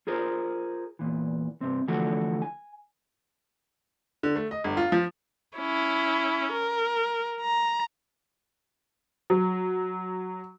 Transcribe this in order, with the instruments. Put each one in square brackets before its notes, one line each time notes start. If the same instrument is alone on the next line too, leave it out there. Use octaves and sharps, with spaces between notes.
[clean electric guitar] F4 G#4 A#4 C5
E2 A#2 E3
G2 C3 C4
D3 E3 F3 A3 F#4
G#5
[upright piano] D3
A3
D#5
G1
F4
F3
[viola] C#4 E4
A#4
A#5
[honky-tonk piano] F#3